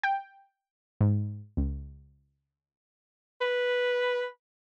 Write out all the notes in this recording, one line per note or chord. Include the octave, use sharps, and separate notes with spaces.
G5
G#2
C#2
B4